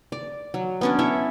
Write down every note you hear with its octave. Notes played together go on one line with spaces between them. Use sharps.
D5
F#3
B3 C#4 D4
E4 A4 C#5 E5